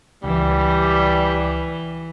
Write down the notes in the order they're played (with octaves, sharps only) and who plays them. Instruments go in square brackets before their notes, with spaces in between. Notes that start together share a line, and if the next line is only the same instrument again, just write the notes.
[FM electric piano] C#2 [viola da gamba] E3 [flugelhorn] G3